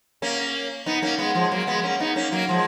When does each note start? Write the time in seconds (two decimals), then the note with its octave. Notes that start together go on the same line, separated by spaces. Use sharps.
0.22 A#3 C#4
0.86 B3 D#4
1.03 A#3 C#4
1.19 G#3 B3
1.35 F3 G#3
1.51 F#3 A#3
1.67 G#3 B3
1.83 A#3 C#4
2.00 B3 D#4
2.16 A#3 C#4
2.32 F#3 A#3
2.49 F3 G#3